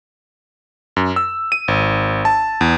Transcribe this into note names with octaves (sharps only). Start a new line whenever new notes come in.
F#2
E6
D#7
G#1
A5
E2